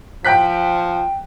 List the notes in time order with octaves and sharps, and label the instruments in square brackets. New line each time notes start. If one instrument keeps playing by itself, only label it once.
[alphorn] F3 [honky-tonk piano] G5 F#6 B6